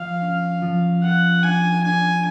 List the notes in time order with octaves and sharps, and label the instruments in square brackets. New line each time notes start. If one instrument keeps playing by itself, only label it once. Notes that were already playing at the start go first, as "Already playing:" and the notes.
Already playing: [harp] F3 [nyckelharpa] F5
[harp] C#4
F3
[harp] F4 [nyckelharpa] F#5
[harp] D4 [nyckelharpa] G#5
[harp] D4 [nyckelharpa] G#5